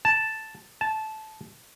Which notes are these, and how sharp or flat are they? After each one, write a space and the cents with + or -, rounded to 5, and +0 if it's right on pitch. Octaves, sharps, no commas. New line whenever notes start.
A5 +0
A5 -15